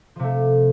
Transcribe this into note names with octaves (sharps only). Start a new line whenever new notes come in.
C3 F3 A3